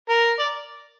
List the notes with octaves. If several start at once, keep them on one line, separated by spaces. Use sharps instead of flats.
A#4
D5